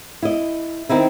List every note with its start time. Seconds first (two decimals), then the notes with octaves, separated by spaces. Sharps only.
0.23 E4 D#5
0.89 D#3 C4 D#4 E4